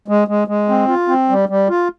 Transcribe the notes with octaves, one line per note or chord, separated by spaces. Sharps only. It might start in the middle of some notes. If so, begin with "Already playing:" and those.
G#3
G#3
G#3
C4
F4
C4
G3
G3
F4